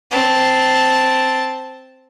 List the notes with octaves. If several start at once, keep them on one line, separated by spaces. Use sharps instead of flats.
C4 A5